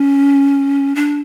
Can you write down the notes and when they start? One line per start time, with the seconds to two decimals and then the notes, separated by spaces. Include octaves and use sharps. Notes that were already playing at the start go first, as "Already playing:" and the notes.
Already playing: C#4
0.96 D4